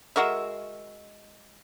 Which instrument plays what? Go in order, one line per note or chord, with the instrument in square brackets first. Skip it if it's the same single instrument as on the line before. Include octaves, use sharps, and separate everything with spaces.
[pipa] G#3 F#4 A#4 E5